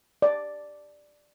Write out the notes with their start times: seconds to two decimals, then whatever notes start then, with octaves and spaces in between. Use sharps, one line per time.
0.22 D5